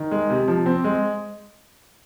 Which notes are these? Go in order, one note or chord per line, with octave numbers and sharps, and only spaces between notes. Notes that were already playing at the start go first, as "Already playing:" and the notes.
Already playing: D#3
G#3
C3
F3
C4
G#3